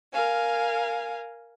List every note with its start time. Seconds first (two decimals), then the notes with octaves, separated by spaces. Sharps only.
0.12 A#4 F5 G#5